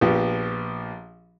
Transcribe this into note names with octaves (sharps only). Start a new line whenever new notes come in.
A#1 F3 B3 G4